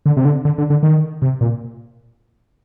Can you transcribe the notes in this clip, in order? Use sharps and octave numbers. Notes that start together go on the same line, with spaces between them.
D3
C3
D3
D3
D3
D3
D#3
C3
A#2